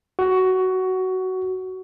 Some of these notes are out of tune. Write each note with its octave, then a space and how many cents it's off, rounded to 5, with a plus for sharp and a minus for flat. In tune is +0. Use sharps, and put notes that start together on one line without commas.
F#4 +15